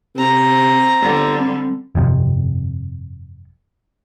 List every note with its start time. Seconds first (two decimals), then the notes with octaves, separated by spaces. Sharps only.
0.16 C3 C4 A#5
1.01 G1 D3 G3
1.40 C4
1.95 G1 F2 C3